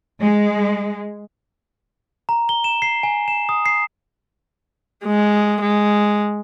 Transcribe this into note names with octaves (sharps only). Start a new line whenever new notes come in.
G#3
A#5
G7
E7
C7
G#5
E7
D#6
C7
G#3
G#3